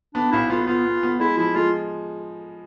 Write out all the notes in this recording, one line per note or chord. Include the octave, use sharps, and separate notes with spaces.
B3 D4
B1 E4
B3 F4
B3 F4
B3
B3
G#3 E4
F3 E4
G#3 F4